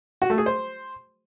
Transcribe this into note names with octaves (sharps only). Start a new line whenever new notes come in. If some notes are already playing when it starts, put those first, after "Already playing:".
F#4
A3
G#4
C5